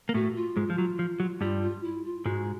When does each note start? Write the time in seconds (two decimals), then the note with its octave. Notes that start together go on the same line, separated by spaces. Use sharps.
0.09 A#3
0.14 A2 A3 F#4
0.35 F4
0.57 G#2 G#3
0.70 F3
0.78 F#3
0.99 F3
1.20 F#3
1.41 G2 G3 F4
1.63 F4
1.84 E4
2.04 F4
2.25 G#2 G#3 F#4